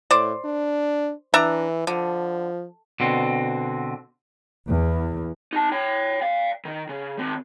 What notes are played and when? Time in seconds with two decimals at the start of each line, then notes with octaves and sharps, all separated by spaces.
0.11 A2 C5 D5
0.45 D4
1.34 E3 D4 E5 A#5
1.87 D3 F3
3.00 B2 D3 C4
4.68 E2
5.53 D#4 A5
5.72 C#5 G5
6.22 D5 F5
6.65 D#3 D#4
6.89 C#3
7.19 D#3 C4